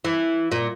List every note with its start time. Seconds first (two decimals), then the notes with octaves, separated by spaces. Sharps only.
0.05 E3
0.52 A#2